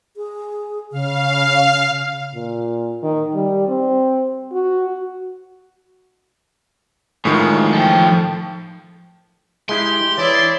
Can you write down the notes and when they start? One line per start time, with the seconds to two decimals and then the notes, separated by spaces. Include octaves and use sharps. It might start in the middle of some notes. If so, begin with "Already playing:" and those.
0.17 G#4
0.92 C#3 F5
2.34 A#2
3.03 D#3
3.34 G3
3.68 C4
4.52 F#4
7.25 A2 D#3 F3 G#3
7.73 F3 A4 G5
9.69 G#3 E4 G4 C6
10.18 E3 E4 G#4 C#5 D5